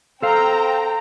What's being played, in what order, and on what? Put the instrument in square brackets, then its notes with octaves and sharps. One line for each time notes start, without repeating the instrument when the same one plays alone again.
[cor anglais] C4 [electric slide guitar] A4 F5 [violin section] G5 A#5